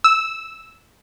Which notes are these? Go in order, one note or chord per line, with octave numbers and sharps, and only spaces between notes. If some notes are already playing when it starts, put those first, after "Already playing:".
E6